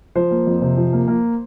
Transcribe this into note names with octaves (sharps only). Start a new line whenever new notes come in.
F3 C5
A#3
F2
C3
F3
A#3
A#3